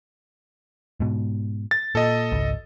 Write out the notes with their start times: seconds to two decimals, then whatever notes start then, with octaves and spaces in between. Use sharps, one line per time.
1.00 G#2 B2
1.71 A6
1.95 A#2 A4 D#5
2.32 G#1 C#2